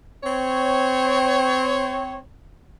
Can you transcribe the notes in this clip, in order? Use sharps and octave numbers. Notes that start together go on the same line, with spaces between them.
C4 C#5